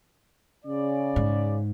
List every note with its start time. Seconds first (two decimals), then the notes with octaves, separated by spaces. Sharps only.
0.65 C#3 D5
1.16 G#2